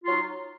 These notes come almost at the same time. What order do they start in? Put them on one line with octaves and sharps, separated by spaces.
F4 F#3 D#4